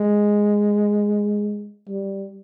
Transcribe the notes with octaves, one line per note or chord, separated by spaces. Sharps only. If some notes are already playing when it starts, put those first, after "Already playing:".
Already playing: G#3
G3